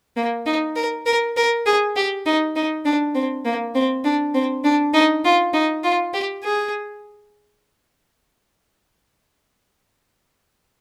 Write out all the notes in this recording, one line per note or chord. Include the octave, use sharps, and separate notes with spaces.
A#3
D#4
A#4
A#4
A#4
G#4
G4
D#4
D#4
D4
C4
A#3
C4
D4
C4
D4
D#4
F4
D#4
F4
G4
G#4